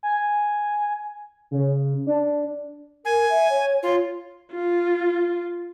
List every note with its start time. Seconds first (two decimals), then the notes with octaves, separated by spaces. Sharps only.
0.03 G#5
1.51 C#3
2.07 D4
3.05 A#4 G#5
3.29 E5
3.49 C#5
3.83 F4 C#5
4.52 F4